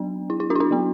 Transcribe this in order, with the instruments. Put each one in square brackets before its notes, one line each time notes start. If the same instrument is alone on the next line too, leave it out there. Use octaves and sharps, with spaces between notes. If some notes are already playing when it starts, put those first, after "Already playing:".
Already playing: [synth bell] F#3 B3 D4
E4
E4
D4 F#4
E4
D4 F#4
F#3 B3 D4